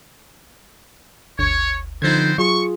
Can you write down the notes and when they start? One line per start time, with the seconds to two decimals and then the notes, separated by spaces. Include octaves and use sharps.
1.39 G1 D2 C#5
2.02 D3 F3 B3 C4 D#4 C5 G#6 A6
2.38 F#3 F4 G#4 C#6